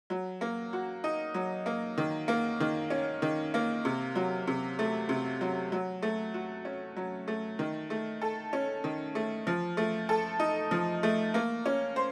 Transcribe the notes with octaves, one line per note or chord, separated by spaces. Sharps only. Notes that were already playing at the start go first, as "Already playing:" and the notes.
F#3
A#3
F#4
D#4
F#3
A#3
D#3
A#3
D#3
C#4
D#3
A#3
C3
F#3
C3
A3
C3
F#3
F#3
A3
F#4
C#4
F#3
A3
D#3
A3
A4
C#4
D#3
A3
F3
A3
A4
D#4
F3
A3
A#3
C#4
C5